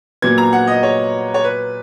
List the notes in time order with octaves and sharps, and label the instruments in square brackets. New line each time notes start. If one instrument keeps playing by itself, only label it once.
[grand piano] A#2 F#3 B3 [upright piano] G#6
[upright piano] A#5
F#5
D#5
C#5
C#5
B4